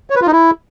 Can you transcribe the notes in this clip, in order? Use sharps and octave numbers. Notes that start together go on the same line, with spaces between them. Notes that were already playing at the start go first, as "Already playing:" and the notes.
C#5
B4
F4
D#4
E4